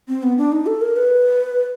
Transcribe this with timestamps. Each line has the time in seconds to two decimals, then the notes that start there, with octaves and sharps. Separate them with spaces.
0.08 C4
0.23 B3
0.38 D4
0.52 D#4
0.66 A4
0.81 A#4
0.96 B4